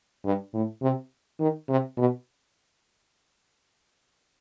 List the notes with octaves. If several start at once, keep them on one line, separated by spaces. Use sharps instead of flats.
G2
A2
C3
D#3
C3
B2